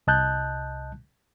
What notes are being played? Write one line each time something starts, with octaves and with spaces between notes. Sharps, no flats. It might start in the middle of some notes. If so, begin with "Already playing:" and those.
C2 D#5 A5 F#6 G6